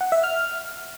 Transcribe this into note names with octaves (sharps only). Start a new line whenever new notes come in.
F#5
E5
F6